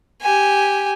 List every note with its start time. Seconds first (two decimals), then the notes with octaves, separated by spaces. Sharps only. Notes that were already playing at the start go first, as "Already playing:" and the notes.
0.22 G4 G#5